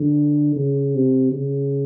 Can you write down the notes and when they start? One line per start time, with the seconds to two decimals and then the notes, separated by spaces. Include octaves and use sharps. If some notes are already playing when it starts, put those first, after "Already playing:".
Already playing: D3
0.56 C#3
0.95 C3
1.31 C#3